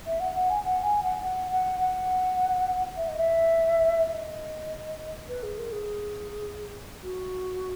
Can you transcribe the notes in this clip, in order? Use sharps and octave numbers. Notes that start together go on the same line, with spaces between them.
E5
F#5
F#5
G#5
F#5
G#5
F#5
F#5
F#5
F#5
E5
D#5
E5
D#5
B4
G#4
A#4
G#4
F#4